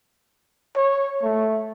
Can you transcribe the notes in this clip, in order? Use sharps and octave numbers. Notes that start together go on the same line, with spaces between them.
C#5
A3